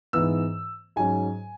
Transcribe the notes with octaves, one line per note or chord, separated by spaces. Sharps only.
G#2 E3 B3 E6
G#2 F#3 C#4 G#5